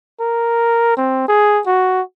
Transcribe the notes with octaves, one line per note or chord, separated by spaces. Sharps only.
A#4
C4
G#4
F#4